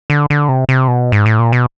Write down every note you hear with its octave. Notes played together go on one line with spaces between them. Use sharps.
D3
D3
C3
C3
B2
G#2
A2
A#2
B2